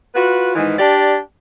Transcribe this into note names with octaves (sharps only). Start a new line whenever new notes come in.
F4 F#4 B4
G#2 D#3 E3
D4 G4 D5